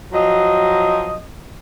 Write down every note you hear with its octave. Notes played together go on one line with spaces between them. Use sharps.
F3 F#3 D#5